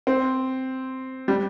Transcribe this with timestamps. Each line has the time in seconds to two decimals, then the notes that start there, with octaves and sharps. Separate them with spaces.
0.07 C4
1.28 G3